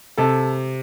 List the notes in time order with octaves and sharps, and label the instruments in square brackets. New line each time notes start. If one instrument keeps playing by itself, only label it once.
[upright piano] C3 [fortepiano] A4